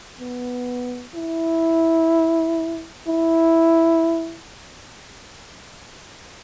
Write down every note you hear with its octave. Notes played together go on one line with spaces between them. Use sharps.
B3
E4
E4